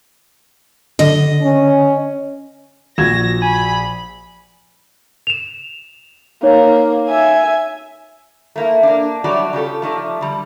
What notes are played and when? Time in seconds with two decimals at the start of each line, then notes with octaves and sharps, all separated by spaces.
0.99 D3 D#5
1.42 C#4
2.98 A#1 F#4 G#6 A#6 E7
3.42 G#5 B5
5.27 E7 F7
6.43 A#3 D#4 C#5
7.08 E5 G#5
8.56 A3 A#3 E4
8.83 A#3 D4
9.24 F#3 G3 A3 F#4 G4 D5
9.53 C#3 F4 G4 A4
9.82 F3 A3 D#4 D5
10.21 D3 G3